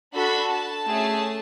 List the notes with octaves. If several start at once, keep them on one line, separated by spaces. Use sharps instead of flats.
D4 F#4 A4 B5
A5
A3 C#4 G#4